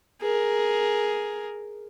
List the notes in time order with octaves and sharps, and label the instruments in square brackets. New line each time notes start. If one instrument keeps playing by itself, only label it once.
[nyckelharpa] G#4 A#4